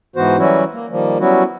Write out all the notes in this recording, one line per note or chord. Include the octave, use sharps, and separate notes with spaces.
G#2 E3 B3 F#4 C5
E3 F#3 G3 C#4 E4 F#4
A#3
D#3 F3 G3 A#3
F#3 G3 B3 C#4 E4 F#4